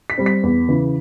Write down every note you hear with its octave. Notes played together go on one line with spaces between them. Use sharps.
B6
G3 C4
B6
E2
C#3 E3